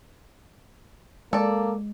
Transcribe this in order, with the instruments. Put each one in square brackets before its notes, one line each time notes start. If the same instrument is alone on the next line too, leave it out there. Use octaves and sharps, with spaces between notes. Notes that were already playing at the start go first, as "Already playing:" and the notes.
[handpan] G#3 [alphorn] A#3 [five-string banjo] A4 D5